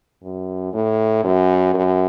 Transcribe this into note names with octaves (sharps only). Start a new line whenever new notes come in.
F#2
A2
F#2
F#2